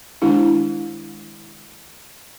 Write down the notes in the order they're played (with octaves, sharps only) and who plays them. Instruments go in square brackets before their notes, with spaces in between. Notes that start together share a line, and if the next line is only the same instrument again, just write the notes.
[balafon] D#3 G#3 D4 E4 G4